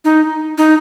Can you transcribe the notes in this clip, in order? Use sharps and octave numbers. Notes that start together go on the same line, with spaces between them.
D#4
D#4